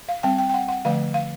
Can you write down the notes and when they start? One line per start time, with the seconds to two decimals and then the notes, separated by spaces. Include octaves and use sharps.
0.09 F5
0.23 G3 C4 G5
0.38 G5
0.49 G5
0.54 F#5
0.69 F#5
0.85 D3 F3 A3 F5
1.14 F5